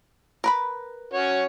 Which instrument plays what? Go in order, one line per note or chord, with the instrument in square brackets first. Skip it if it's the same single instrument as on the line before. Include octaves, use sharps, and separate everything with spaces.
[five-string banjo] A#4 B4 B5
[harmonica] C#4 F#4 C#5